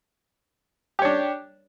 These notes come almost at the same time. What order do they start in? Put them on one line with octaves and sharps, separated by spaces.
G4 C#5 D4